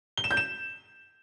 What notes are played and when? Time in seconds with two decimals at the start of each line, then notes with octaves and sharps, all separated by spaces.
0.17 G7
0.24 E7
0.31 G6
0.37 E7